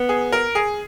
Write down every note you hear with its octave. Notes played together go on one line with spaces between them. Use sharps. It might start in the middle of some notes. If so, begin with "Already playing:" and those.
Already playing: B3
G#4
A#4
G#4